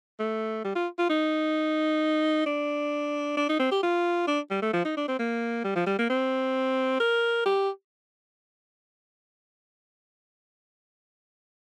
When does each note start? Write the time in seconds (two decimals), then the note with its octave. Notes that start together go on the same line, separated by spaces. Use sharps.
0.20 A3
0.64 G3
0.76 F4
0.99 F4
1.10 D#4
2.46 D4
3.37 D4
3.49 D#4
3.60 C4
3.72 G4
3.83 F4
4.28 D4
4.51 G3
4.62 A3
4.73 F3
4.85 D#4
4.97 D4
5.08 C4
5.19 A#3
5.65 G3
5.76 F3
5.86 G3
5.99 A#3
6.10 C4
7.00 A#4
7.46 G4